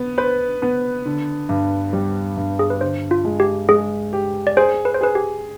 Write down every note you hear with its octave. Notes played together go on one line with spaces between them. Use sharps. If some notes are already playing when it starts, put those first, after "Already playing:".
Already playing: B3
B4 C5
B3
D3
G2
G3
G2
G#4
B4
D3 C5
F4
G#3
G4
G#3 G#4
G4
D5
G#4 C5
B4
C5
G#4 B4
G4